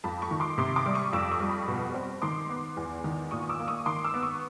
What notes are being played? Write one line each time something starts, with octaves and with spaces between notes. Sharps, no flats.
F2 A5 B5
B5 C#6
D#3
C6 D6
C3 C6 D6
C6 D6
G3
C#6 D#6
F2 D6 E6
C#6 D#6
G3
B5 C#6
B2
C4
D#3 C6 D6
B3
E2
D#3
A#2 C#6 D#6
D6 E6
A#3
C#6 D#6
D#3 C6 D6
D6 E6
B3
C#6 D#6